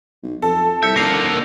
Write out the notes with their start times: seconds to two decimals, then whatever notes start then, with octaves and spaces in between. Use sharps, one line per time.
0.23 B1
0.42 F2 A4
0.83 C2 E5 G6 C#7
0.96 D#1 D3 A#3 A#6 C7 F7